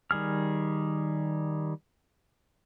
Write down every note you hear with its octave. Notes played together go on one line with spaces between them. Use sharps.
D#3 G3 G#4 F6